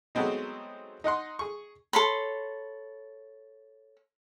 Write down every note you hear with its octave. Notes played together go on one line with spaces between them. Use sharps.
F#3 G#3 A3 B3 C4 D#4
D#4 D#5 F#5 C6
G#4 C#6
A4 C#5 B5 C6